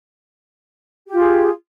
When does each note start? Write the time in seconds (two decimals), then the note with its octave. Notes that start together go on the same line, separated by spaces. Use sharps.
1.08 G4
1.13 F4
1.17 G#4